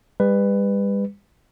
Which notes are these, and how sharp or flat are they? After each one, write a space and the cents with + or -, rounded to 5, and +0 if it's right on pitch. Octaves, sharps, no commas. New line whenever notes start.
G3 +40 B4 +10